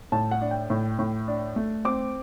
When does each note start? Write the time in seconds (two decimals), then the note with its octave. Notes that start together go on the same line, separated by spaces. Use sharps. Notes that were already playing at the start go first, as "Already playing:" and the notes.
0.12 A2 A5
0.31 F#5
0.41 D4
0.51 G5
0.70 A2
0.99 A2
1.28 D4
1.56 A3
1.85 C4 D6